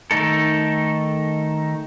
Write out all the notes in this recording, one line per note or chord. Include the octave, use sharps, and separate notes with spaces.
D#3 A3 D#4 A4